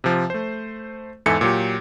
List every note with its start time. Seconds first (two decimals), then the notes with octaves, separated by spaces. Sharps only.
0.04 C3 F3
0.30 A3 C5
1.26 E2 G#2 A4 E5 G#5 C#7
1.41 A#2 F#3 G4